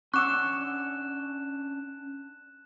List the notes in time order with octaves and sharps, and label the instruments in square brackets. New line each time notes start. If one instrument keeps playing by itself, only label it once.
[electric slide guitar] C#4 D4 F#5 [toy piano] C#6 D6 E6 [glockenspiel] F#6 E7